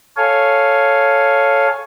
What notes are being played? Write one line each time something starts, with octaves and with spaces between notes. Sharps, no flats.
A4 C#5 F5 G#5